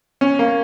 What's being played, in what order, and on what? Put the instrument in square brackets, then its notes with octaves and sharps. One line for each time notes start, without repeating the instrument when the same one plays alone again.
[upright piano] C#4
A#3